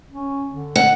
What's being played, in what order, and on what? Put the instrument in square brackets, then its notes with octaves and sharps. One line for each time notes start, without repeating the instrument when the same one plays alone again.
[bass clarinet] C#4
D3
[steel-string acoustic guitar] F#5